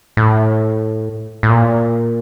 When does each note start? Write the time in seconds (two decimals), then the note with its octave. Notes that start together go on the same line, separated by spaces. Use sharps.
0.17 A2
1.43 A2
1.49 A#2